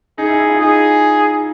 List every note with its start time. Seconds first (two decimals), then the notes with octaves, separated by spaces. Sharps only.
0.18 D#4 G#4
0.29 E4
0.39 E4
0.50 F4
0.60 D#4 G#4